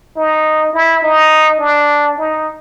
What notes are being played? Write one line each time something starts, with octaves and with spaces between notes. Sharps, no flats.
D#4
E4
D#4
D4
D#4